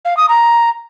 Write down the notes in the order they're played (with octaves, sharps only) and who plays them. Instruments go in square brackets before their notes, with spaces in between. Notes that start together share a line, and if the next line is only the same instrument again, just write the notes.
[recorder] F5
D#6
A#5